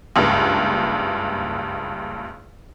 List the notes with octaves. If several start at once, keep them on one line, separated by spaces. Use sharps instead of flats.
F#1 C#2 G2